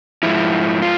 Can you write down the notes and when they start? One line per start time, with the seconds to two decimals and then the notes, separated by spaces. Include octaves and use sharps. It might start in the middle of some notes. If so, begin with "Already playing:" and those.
0.23 G#2 F3 E4
0.82 F4